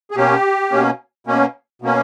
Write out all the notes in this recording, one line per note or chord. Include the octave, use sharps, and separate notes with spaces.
G#4
B2 A#3 C#4 G4
B2 A#3 C#4
B2 A#3 C#4
B2 A#3 C#4